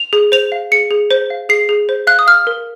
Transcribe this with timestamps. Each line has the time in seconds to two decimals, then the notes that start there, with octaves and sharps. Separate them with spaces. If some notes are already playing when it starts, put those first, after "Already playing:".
Already playing: F7
0.13 G#4
0.32 C5 F7
0.52 F5
0.72 G#4 C#7
0.91 G#4
1.11 C5
1.30 F5
1.49 G#4 C7
1.69 G#4
1.89 C5
2.07 F5 F#6
2.19 D#6
2.26 F5 F6
2.47 A#4